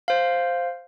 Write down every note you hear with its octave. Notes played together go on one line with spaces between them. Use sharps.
C5 F5